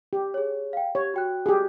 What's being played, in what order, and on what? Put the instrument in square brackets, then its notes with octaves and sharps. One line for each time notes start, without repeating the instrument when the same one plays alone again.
[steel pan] G4
[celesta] G#4 C#5
F5 G5
[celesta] G4 [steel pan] C#5
[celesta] F#4 G5 F#6
[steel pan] G4 G#4